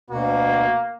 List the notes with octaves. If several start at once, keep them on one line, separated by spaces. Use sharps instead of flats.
D2 B2 A#3 F#4